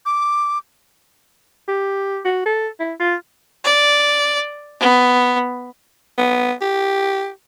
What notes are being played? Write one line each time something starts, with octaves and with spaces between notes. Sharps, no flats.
D6
G4
F#4
A4
E4
F4
D5
B3
B3
G4